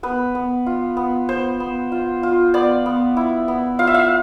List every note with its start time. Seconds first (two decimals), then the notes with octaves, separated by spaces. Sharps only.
0.03 B3 B4
0.35 B3
0.66 F4
0.97 B3
1.29 B3 C5
1.60 B3
1.92 F4
2.23 F4
2.54 B3 D5
2.86 B3
3.17 E4
3.48 B3
3.79 F4 F5
3.87 E5
3.94 F5